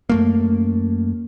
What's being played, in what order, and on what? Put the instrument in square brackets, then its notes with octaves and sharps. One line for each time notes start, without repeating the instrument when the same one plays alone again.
[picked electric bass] F#2 A3 A#3